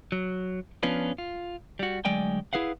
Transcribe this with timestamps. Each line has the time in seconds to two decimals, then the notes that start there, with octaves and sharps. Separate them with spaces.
0.12 F#3
0.83 F3 B3 C#4 D4 F4 B4
1.18 F4
1.79 G3 F#4
2.05 D2 F#3 G#3 D5 G5 G#5
2.53 E4 G#4 B4 F5 F#5